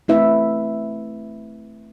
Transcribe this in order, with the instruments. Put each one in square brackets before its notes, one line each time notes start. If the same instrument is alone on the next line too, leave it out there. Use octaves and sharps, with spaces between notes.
[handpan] A3 C4 E4 B4 E5